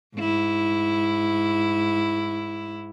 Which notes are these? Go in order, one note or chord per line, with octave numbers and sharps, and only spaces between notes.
G#2 E4